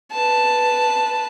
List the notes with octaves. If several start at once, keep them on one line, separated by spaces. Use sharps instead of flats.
B4 A5